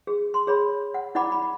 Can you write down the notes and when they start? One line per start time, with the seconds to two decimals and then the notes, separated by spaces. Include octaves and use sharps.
0.07 G#4
0.34 C6
0.47 G#4 C#5 B5
0.94 F#5
1.15 E4 D5 F#5 B5 D6
1.32 B5